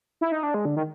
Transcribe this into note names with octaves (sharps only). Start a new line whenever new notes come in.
E4
D#4
D4
G#3
D3
D#3